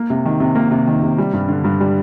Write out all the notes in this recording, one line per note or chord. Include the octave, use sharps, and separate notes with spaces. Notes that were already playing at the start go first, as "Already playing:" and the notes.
Already playing: A#3
C3
D#3
C3
A#3
C3
D#3
C3
G3
G2
D3
G2
G3